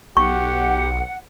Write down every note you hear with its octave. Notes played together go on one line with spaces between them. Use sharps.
B1 G4 F#5 C#6